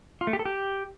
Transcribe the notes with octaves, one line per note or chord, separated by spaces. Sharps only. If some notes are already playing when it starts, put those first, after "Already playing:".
F4
A3
G4
A4
G4